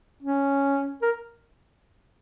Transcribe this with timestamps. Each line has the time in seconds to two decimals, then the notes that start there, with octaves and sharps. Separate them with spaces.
0.23 C#4
1.02 A#4